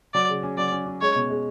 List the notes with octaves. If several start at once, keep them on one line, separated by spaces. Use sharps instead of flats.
F#3 D5
C#3
C#4
F#3 D5
C#4
C#4
G#3 C#5
B2
G#3